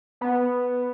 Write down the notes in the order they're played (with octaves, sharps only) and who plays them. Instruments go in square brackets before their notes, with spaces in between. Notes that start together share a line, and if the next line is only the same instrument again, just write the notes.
[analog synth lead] B3